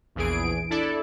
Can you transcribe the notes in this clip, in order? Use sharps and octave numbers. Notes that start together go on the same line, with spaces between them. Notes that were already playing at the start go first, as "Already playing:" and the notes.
A#1 E2 E3 G#4 D7
D4 E4 A4 D5